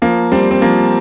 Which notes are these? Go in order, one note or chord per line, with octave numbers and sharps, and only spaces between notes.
F3 A#3
G3 C4
C4
F3 A#3